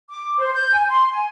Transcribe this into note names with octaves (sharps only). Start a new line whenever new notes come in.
D6
C5
G6
G#5
C6
G#5